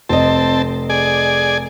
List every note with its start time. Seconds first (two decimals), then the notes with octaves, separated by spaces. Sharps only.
0.09 F1 C4 D#5 A5
0.90 G#4 D5 G#5